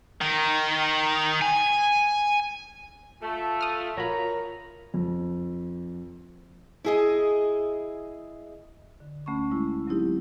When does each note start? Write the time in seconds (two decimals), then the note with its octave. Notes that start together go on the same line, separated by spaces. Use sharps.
0.21 D#3
1.42 G#5
3.22 A3 F4 A5
3.61 D#6 F6
3.97 A#1 F#4 A#4 C#5 A#5 B5
4.94 F2
6.84 E4 G#4 D#5
9.00 D3
9.26 D2 A3 C#4 B5 C#6
9.51 G3 G#3 E4
9.87 F#3 C4 D#4 E4 G4